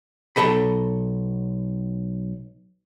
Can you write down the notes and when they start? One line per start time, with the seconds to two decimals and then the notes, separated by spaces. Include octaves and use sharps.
0.36 B1 B2 A4 D#5 B5